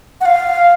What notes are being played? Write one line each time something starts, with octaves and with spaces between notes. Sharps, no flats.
F#5
F5